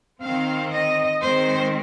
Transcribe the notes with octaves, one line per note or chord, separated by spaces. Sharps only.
D#3 C4 F5
D#5
D#3 G#3 C4 C5